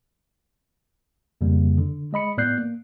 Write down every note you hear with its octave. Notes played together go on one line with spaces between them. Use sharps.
F2 C#3 G3 A#3
D3
G#3 D#5 B5 C#7
A2 B3 D5 F#6 G6 C7
A#3